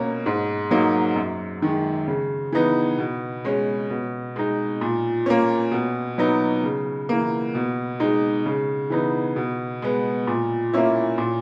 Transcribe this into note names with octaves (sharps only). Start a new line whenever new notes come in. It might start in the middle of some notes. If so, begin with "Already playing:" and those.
Already playing: B2 A#3 C#4
G#2
F#3 A#3 D#4
F#2
D#3 G#3
C#3
E3 B3 D#4
B2
G#3 C#4
B2
G#3 D#4
A#2
A#3 C#4
B2
F#3 B3 D#4
C#3
E3 A#3
B2
G#3 D#4
C#3
E3 B3 D#4
B2
G#3 B3
A#2
A#3 C#4 E4
A#2